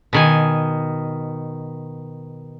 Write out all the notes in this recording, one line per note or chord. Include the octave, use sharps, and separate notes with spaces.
B2 D#3 G#5